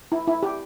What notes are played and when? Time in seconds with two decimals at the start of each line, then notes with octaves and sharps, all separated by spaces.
0.12 E4
0.28 E4
0.43 G4